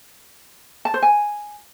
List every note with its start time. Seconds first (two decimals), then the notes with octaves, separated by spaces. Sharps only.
0.85 A5
0.94 C5
1.03 G#5